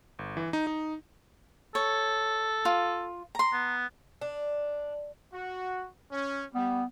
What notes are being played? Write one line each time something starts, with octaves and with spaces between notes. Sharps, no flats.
G1
E3
D#4
D#4
A4 C#5
F4
A#5 C6
B3
D4
F#4
C#4
G3 B3